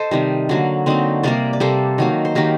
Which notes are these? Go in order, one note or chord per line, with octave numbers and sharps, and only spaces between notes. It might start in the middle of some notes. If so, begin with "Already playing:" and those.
Already playing: A4 C5 D#5
C3 D#3 G3
D3 F#3 A#3
D3 F#3 A#3 C4 D#4
C3 G3 A#3 A#4 D5
D5
C3 G3 A#3 A4 C5
D#3 F#3 A#3
C5
D#3 F#3 A#3 G4 A#4